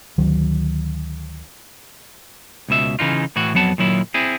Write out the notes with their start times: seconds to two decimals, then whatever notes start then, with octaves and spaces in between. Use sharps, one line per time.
0.18 D2 D#3 F#3
2.69 C#2 B2 E5
2.99 C#3 E3 D#4 F4
3.36 A2 E3 F#4
3.54 F2 F#3 B3 F#5 A5
3.78 A#2 D#3 F#3 E4
4.14 C4 E4 G#4